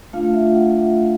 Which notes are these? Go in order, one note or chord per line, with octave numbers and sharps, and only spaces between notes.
A3 D4 F4 F5
E5
F#5